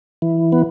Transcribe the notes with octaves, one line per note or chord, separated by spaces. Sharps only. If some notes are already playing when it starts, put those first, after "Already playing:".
E3
B3